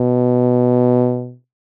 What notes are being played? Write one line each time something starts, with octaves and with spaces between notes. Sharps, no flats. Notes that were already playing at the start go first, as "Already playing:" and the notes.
Already playing: B2